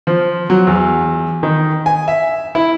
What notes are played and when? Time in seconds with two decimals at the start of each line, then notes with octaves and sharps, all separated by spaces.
0.07 F3
0.50 F#3
0.67 E2
1.43 D#3
1.86 G#5
2.08 E5
2.55 E4